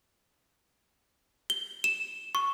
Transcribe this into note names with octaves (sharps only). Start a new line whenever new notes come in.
G7
E7
C#6